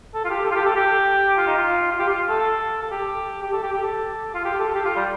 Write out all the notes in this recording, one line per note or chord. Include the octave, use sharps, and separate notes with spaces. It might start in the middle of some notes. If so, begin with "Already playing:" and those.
A4
F4
G4
A4
F4
G4
A4
G4
F4
D#4
F4
F4
G4
F4
A4
A4
G4
G4
A4
G4
G4
A4
F4
G4
A4
G4
F4
G3